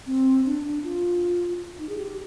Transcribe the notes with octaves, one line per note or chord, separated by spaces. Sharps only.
C4
D4
F4
D#4
G#4
G4